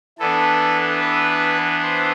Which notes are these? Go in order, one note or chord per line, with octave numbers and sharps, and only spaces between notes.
E3 B3 D4 A4
B4
C5